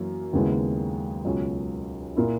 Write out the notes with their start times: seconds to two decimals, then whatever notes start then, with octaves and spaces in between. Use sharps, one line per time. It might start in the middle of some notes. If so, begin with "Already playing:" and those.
Already playing: F#2 E3 A#3
0.33 D#2 C#3 G#3 B3 E4
1.25 C#2 B2 F#3 C#4
2.16 A#2 A#3 E4